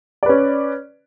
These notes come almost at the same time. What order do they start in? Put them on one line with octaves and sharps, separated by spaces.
D5 B4 C#4